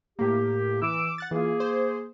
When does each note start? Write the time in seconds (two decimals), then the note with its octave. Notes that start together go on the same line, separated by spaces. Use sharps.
0.19 A2 A#3 G4
0.82 E3 D6 E6
1.18 F#5 F#6 A6
1.31 E3 A#3 F4 G#4
1.60 C5